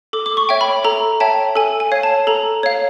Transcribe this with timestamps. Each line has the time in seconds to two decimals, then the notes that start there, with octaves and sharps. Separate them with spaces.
0.13 A4 D6
0.26 D6
0.37 C#6
0.49 C#5 E5 G5
0.61 B5
0.84 A4 A#5
1.20 C#5 E5 G5 A5
1.56 A4 G#5
1.80 G#5
1.92 C#5 F5
2.03 A5
2.27 A4 A#5
2.63 C#5 F5